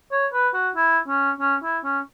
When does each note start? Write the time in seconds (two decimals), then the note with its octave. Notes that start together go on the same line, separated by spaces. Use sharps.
0.12 C#5
0.33 B4
0.54 F#4
0.76 E4
1.08 C#4
1.40 C#4
1.63 E4
1.84 C#4